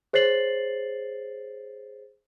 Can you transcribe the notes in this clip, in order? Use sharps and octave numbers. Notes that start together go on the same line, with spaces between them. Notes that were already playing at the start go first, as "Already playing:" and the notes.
G#4 C5 C#5 A6 C7 F#7